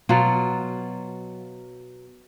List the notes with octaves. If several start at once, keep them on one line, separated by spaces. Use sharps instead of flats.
B2 F#3 F4